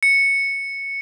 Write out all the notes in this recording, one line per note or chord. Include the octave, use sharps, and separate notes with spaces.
C#7